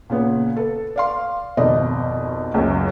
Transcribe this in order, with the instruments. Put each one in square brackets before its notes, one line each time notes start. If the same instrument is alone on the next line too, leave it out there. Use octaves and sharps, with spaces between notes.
[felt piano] A#2 C#3 B3
A4 B4
D5 F5 C6
G#1 F2 B2 D5 D#5
C#2 F#2